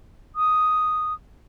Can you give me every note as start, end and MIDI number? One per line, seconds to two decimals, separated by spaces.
0.36 1.14 87